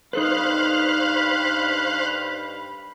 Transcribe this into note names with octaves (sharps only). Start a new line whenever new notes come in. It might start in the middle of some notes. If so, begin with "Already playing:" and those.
G2 D#4 A4 B4 C5 F5 B5 F#6